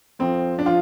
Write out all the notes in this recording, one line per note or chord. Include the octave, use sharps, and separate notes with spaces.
F2 F3 C4
D4
F3 F4